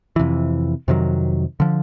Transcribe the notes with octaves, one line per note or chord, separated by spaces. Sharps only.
F2 C3 E3
F2 C3 D#3 F#3
D3 F3